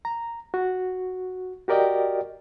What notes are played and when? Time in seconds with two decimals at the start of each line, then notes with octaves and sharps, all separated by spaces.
0.05 A#5
0.54 F#4
1.68 F#4 G4 A#4 D5 D#5 G5